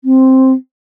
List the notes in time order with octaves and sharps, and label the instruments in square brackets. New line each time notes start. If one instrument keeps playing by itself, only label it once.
[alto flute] C4